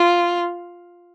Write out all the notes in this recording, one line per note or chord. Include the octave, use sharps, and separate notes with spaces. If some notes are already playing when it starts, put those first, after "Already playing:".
Already playing: F4